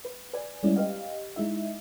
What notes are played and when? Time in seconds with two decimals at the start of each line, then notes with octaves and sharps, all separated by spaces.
0.05 B4
0.33 B4 D5 G#5
0.63 G3 G#3 B3 C#4 E4 D5
0.76 G4 B4 D#5 F5
1.36 G#3 D#4 E4 E5